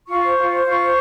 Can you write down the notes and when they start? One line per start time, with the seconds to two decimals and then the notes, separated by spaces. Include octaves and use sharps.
0.07 F4 C#6
0.22 C5
0.36 F4
0.51 C5
0.66 F4 C#6
0.80 C5